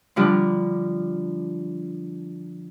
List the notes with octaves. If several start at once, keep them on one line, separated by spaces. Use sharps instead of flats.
D3 F3 G3